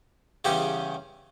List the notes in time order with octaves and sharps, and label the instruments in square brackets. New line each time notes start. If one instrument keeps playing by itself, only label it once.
[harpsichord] E2 C#3 G3 C#4 G4